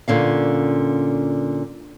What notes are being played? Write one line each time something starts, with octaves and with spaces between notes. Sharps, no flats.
A#2 D3 C#4 F5